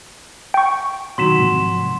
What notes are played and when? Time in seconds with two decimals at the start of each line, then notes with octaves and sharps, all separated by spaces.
0.54 G5 C#6
1.18 B2 D#3 F#3 C6 B6 E7
1.38 G#2 C3 F3